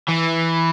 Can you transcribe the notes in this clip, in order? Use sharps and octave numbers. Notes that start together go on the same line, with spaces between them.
E3